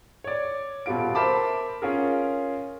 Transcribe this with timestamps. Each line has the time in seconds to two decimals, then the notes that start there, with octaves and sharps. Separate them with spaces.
0.24 C#5 D5
0.86 D#1 B2 G3 F4 D7
1.15 A#4 C5 E5 A5 B5 D6
1.82 C#4 F4 G#4 A#4